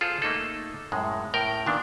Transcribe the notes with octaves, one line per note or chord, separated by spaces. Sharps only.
F4 G#4 A4 C5
A3 A#3 D#4 A4
F#2 A2 G#3
A2 A#4 G5
A#2 D#3 B3 D4